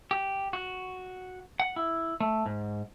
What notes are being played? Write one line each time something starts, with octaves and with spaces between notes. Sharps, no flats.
G4
F#4
F#5
E4
A3
G#2